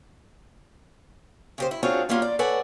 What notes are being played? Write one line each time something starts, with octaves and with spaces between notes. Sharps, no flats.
C#3 G4 C5
E4
C4 D4 F4 F#4 G#4 C#5
G3 A#3 B3 C#4 F4
D5
A4 B4 C#5 D5 F#5 G#5